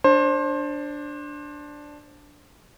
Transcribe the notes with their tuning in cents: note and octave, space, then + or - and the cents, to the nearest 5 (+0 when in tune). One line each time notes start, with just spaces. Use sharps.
D4 +0 C5 +25